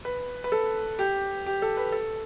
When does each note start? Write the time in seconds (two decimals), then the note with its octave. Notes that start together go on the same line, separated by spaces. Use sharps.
0.05 B4
0.44 B4
0.52 A4
0.99 G4
1.46 G4
1.62 A4
1.77 B4
1.92 A4